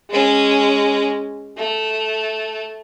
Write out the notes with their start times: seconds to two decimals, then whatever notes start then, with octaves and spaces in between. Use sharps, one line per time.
0.10 G#3 C#4
1.57 A3